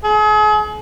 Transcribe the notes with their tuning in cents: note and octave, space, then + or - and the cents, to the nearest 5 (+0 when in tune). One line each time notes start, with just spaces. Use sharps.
G#4 +40